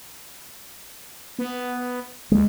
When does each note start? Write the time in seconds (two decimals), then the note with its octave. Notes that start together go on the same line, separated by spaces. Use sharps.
1.39 B3
2.32 D2 G#3